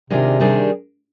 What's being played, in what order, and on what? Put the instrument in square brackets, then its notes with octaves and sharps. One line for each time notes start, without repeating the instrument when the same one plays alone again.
[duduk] C3 [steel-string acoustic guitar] D#3 G#3 D4 F4 G#4
[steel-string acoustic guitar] D#2 D#3 G3 D4 G#4